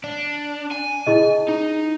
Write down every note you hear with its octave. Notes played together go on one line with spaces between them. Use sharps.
D4
G#5
E4 G#4 D#5
D#4